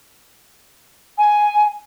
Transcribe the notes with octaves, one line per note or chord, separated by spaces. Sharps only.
G#5